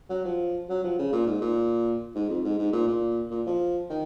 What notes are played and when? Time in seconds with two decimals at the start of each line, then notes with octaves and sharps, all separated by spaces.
0.10 F#3
0.25 F3
0.69 F#3
0.84 F3
0.99 C#3
1.13 A#2
1.27 G#2
1.41 A#2
2.15 G#2
2.29 F2
2.44 G#2
2.58 G#2
2.73 A#2
2.88 A#2
3.31 A#2
3.47 F3
3.90 D#3